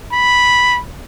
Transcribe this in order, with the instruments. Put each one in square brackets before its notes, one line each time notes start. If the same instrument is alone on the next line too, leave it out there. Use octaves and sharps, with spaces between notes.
[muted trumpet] B5